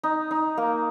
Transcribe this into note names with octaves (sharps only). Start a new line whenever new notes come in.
D#4
D#4
A#3